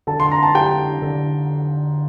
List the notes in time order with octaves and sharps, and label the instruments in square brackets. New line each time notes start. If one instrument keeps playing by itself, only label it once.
[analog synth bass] D3 [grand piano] A4 A5
[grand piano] C6
A#5
A5
G4 G5
[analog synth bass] D3